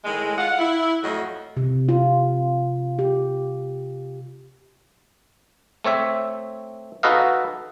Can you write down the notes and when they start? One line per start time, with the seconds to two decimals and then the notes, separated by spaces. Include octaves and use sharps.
0.05 A2 D#3 G#3
0.38 F4 F#5
0.59 E4
1.03 F2 A2 F#3 A3 D#5
1.57 C3
1.89 F4
2.99 G4
5.84 A3 C4 C#5 E5
7.03 D#4 F#4 A4 B4 D#5 F5